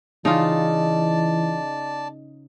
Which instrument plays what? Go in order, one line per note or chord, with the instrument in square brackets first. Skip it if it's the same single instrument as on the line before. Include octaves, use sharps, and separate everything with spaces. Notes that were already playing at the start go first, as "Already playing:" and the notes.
[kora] C#3 F4 [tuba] E3 [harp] D#4 [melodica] D5 A5